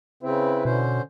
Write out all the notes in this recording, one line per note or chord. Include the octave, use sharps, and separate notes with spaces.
C#3 C4 E4 B4
B2 D3 C#4 C5